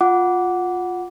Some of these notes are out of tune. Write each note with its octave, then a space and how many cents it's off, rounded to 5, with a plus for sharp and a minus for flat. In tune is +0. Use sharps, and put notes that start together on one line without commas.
F4 +15 F#5 +0 D6 -15